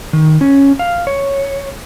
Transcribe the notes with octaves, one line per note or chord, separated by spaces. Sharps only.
D#3
C#4
F5
C#5